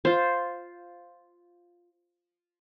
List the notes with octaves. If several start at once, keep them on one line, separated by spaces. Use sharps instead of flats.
F4 C5